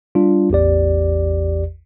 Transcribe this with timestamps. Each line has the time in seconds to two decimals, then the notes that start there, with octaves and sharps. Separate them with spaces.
0.15 G3 D4 F4
0.50 A1 E2 G4 D5